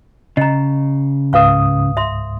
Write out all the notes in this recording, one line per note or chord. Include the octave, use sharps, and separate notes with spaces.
C#3 D#5 A#5
C#2 G#2 B4 F5 C#6 D#6
E5 C6